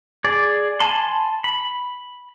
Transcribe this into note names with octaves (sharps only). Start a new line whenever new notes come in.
G#4 D5
G#5 A5 B5 C6
B5